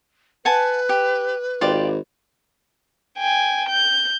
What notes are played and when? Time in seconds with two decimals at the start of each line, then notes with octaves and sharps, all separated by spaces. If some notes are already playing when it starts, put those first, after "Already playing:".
0.45 B4 F#5 G#5 A5
0.89 G4
1.61 G#1 F4 G4 D5
3.18 G5 G#5
3.69 G6